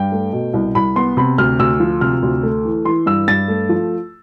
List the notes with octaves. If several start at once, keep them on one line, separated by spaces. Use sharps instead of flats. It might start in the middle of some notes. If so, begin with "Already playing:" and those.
Already playing: G2 G5
A3
B2
C2
C2 B5
B3 C6
C3 B5
D2 F6
D2 E6
F3
C3 F6
D2
A3
E3
E3 C6
G2 E6
G2 A6
A3
F3